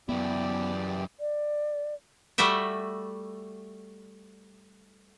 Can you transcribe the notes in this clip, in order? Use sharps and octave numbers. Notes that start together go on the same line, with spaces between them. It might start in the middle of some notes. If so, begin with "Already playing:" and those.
F#2 E3 B3 E4 G4 D5
D5
G3 A3 F#4 E5 G5